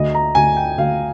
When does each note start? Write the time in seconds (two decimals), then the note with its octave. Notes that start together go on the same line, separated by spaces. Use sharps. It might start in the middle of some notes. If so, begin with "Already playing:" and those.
Already playing: D2 D#5
0.15 A#5
0.35 D2 G#5
0.57 G5
0.78 D2 F5